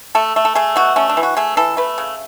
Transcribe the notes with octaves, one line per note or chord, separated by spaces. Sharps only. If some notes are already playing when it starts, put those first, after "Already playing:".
A3 A4
A3
A4
A3 G#4
B2 F#4
A3 C#4
D4
E3
F#4
A3 G#4
E3 A4
A3 B4
C#3